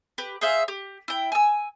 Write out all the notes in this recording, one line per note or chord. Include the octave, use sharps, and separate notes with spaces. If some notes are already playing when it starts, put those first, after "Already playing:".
G4 B4
G#4 C5 E5 F5
G4
E4 G5
G#5 E6